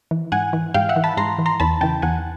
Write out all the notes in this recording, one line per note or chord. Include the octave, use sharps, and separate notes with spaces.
E3
G#2 F#5 G#5
E3
G#2 F5 G5
E5 F#5
E3
A5 B5
G#2 A#5 C6
E3
A#5 C6
E2 A5 B5
C#3 E3 G5 A5
E2 F#5 G#5